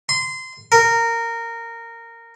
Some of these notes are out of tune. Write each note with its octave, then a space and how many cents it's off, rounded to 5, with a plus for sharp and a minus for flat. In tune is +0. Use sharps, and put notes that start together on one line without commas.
C6 -20
A#4 -15